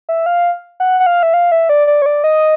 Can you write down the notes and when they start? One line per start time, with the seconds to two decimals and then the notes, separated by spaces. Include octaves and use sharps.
0.09 E5
0.26 F5
0.80 F#5
1.00 F#5
1.06 F5
1.23 E5
1.34 F5
1.52 E5
1.69 D5
1.87 D5
2.02 C#5
2.06 D5
2.24 D#5